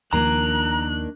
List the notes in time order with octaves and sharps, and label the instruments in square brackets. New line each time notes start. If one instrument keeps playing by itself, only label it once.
[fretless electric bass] D#2 F3 [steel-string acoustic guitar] D#3 A#3 D4 [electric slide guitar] A#5 [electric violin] F#6